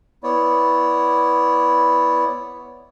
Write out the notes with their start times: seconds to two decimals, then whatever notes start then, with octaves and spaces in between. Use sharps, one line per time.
0.23 B3 E4 C#5 D5